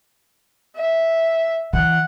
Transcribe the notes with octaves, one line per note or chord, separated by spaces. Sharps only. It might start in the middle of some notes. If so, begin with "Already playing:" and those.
E5
E3 F#5